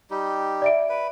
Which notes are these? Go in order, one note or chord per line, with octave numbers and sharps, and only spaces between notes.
G3 D#4 G4
D5 E5 D7
B4